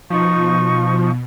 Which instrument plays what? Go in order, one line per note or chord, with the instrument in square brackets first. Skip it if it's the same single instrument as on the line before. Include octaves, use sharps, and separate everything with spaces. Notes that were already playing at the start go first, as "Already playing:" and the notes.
[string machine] B2 [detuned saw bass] F3 [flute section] D#4 C#6